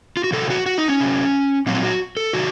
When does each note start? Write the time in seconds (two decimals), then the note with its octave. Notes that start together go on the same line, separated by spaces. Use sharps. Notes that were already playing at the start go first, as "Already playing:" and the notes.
0.17 F4
0.24 F#4
0.32 C3 F#3 A4
0.50 F#4
0.66 F#4
0.78 D#4
0.88 C#4
1.00 C3 F#3
1.66 A#2 F#3 C4
1.83 F#4
2.17 A4
2.33 C3 D#3 F#3 F#4